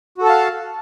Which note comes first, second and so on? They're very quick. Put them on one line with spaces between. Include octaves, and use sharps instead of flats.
F#4 A4 A5 F5